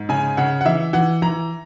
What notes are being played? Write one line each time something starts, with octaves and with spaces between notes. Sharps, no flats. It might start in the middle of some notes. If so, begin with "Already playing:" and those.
Already playing: G#2
C#3 G#5
C#3 F#5
F#5
E3 E5
E3 F#5
E3 A#5